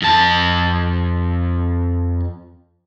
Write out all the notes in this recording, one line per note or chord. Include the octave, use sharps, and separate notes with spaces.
F2 A5